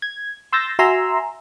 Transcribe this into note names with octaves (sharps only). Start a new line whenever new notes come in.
G#6
C6 E6 G6 A6 A#6
F#4 E5 G#5 A#5 C6 E6